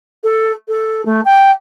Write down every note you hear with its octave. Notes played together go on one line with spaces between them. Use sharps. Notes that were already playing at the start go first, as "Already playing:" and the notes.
A4
A4
A3
G5